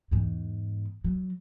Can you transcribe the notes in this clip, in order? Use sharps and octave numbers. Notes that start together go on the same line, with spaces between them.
E2 G#2
F#3